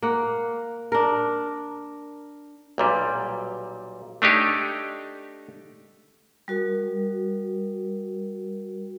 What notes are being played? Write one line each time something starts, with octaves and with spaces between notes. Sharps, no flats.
A#3 F#5
D4 A#4
B1 A#2 G3
A3 D4 D#4 G4 C#5
G3 F#4 A#4